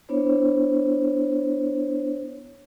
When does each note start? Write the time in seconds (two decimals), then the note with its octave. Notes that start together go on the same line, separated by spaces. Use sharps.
0.09 B3 D4 E4 C5 C#5